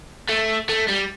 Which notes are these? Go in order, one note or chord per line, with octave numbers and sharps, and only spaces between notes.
A3
A3
G3